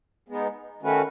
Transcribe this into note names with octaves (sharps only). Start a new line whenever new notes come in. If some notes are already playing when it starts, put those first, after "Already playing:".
G#3 B3 D#4
D#3 A3 C#4 F#4 B4